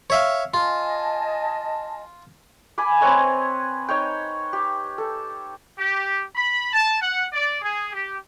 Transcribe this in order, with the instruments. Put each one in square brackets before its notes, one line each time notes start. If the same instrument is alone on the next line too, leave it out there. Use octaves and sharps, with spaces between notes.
[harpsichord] C#5 E5 F5
[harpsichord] F4 [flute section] D#5 G#5 A5
[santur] G#5 B5 D6
C4 B4 C#5 D#5
D#4 C#5 G5
G4
A4
[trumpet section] G4
B5
A5
F#5
D5
G#4
G4